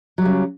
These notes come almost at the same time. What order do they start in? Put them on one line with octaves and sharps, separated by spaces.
F#3 G3 C#3